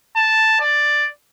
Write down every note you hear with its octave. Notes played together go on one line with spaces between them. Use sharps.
A5
D5